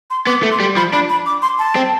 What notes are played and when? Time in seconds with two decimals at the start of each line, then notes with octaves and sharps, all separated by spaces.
0.10 C6
0.27 B3 D6
0.43 A3
0.51 C6
0.60 G3
0.77 F3 B5
0.93 D4 B5
1.09 B5
1.26 D6
1.42 C6
1.59 A5
1.76 C4